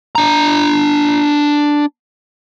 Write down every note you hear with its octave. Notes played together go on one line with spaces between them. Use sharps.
D4 A#5